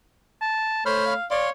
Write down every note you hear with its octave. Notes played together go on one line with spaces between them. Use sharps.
A5
A3 C5 C#5 B5 F6
F5
C#5 D5 F5 C6